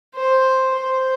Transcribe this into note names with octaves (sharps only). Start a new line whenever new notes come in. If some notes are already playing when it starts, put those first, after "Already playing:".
C5
C5